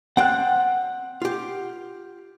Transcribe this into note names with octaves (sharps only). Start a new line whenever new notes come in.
C4 D5 F#5 G5 F#6
F4 G4